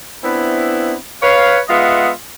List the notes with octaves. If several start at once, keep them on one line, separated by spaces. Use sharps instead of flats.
B3 C4 D4 E4
B4 C#5 F5
G#3 B3 F4 D#5 E5 F#5